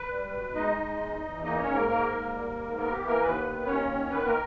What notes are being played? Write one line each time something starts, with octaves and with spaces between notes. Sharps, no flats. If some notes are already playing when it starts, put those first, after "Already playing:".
Already playing: B4
G3
B2
G#3 D#4 D#5
G#3
E2
E2
A#3 D#4 D#5
C#4 C#5
G#2
A#3 A#4
G#2 A#3 A#4
G#2
G3
G#2
A#3 B3 A#4
G4
E3
A#3 A#4
D#2 B3 B4
D#3
D#2 C#4 C#5
D#3
D#3 B3 B4
A#3 A#4